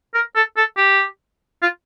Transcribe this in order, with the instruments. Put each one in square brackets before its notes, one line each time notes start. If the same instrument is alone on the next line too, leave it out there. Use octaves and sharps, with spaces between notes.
[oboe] A#4
A4
A4
G4
F4